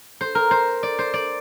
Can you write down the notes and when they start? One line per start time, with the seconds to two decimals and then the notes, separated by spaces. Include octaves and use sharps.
0.21 C5
0.35 A#4
0.51 C5
0.83 D5
0.99 C5
1.14 D5